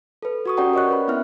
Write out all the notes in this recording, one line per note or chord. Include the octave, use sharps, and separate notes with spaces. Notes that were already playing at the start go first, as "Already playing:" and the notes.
A4 B4
F#4 C#6 D#6
C#4 G4 D5 F#5 G5 A#5
A#4 C#5 D#5 C#6 F#6
C#4 B4 B5
B3 C4 E4 E5 F6